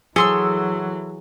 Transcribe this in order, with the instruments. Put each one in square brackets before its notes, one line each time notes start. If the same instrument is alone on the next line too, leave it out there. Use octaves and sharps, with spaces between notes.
[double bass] E3 F#3 [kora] G#4 [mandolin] A4 C6 E6